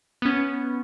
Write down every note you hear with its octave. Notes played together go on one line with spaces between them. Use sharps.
B3 C#4